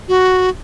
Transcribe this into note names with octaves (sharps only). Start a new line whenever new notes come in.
F#4